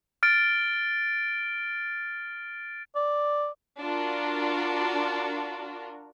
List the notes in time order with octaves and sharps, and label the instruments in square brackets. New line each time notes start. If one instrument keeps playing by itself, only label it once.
[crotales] F6 A6 D7
[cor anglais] D5
[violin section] D4 F4 F#4 A#4